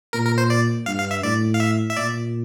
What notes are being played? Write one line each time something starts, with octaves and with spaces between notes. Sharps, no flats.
A#2 A#4
A#4
C5
D5
G2 F5
F5
E5
A2 D5
F5
E5
E5
A#2 D5